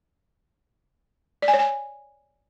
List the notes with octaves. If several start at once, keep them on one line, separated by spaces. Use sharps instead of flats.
D5
G#5
C#5
G#5